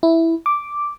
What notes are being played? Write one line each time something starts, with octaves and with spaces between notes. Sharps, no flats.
E4
D6